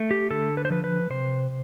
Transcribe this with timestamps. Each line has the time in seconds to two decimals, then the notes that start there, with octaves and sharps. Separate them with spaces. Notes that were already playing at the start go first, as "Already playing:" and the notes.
Already playing: A3
0.11 G4
0.31 D3 A4
0.57 B4
0.65 C5
0.70 F3 B4
0.84 B4
1.10 C3 C5